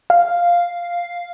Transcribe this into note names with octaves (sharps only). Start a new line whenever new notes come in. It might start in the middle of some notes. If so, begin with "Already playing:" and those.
F5